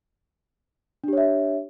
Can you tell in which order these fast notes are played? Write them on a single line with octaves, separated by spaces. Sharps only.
D4 G4 C#5 E5